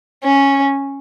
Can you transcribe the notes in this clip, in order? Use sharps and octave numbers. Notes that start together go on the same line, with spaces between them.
C#4